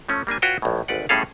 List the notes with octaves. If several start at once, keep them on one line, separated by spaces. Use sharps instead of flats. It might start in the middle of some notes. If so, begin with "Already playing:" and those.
F3 A3 C#4
G3 A#3 D4 G#5
F4 F#4 B4 C#5 F5 G5
A#1 A2
G#1 D2 B4 D5 F#5
A2 G3 C#4 G#4 A4 F5